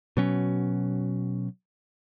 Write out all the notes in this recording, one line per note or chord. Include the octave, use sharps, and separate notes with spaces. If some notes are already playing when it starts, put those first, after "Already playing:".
B2 F#3 C#4